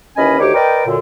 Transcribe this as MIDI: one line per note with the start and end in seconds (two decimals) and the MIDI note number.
0.17 0.39 39
0.17 0.39 52
0.17 0.39 61
0.17 0.39 75
0.17 0.39 80
0.17 0.39 83
0.39 0.53 38
0.39 0.53 51
0.39 0.53 67
0.39 0.53 73
0.39 0.53 86
0.54 0.82 70
0.54 0.82 71
0.54 0.82 74
0.54 0.82 75
0.54 0.82 79
0.86 0.98 42
0.86 0.98 46
0.86 0.98 50